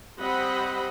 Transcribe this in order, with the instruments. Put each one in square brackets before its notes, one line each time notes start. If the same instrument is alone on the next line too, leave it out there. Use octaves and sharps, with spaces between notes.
[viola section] G3 C4 C5 D#5 F#5 B5